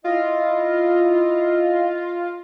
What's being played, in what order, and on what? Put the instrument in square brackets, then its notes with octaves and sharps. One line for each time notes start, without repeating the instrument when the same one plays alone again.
[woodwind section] E4 D#5 [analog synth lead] F4